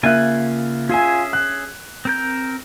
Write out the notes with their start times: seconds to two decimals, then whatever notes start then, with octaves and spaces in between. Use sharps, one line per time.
0.03 C#3 A#3 F4 E5 G#5 F#6
0.89 C#4 F4 G#4 E5 G#5
1.33 F#6
2.05 C4 A#4 G6